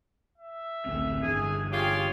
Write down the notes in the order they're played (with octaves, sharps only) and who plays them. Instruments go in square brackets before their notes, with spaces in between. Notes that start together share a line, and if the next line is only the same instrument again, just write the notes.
[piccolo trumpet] E5
[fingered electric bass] A1 D2 C4
[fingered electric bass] G1 E3 [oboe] G#4
[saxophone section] F4 G4 [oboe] G#4 [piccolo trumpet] C#5